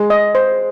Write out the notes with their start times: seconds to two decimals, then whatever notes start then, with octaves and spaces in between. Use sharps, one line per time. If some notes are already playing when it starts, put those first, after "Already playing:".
Already playing: G#3
0.10 D#5
0.35 C5